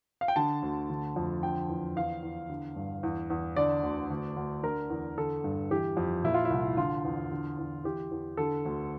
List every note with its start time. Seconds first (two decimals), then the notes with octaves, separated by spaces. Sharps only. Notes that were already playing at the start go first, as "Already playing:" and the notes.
0.21 F5
0.28 G5
0.36 D3 A5
0.62 D2
0.90 D3
1.16 F2
1.43 D3 G5
1.69 E2
1.96 E2 F5
2.22 E2
2.50 D3
2.76 G2
3.03 E2
3.30 E2
3.56 D3 D5
3.83 D2
4.10 D2
4.36 D2
4.63 D3 A#4
4.90 E2
5.18 D3 A4
5.44 G2
5.71 E3 G4
5.97 F2
6.24 A#2 E4
6.34 F4
6.45 E4
6.50 C2
6.77 D3 F4
7.05 E2
7.32 D3
7.58 E2
7.84 E3 G4
8.11 E2
8.37 D3 A4
8.65 D2